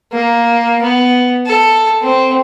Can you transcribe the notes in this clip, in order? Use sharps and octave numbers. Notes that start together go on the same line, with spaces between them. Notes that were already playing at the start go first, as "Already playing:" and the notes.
A#3
B3
A4
C4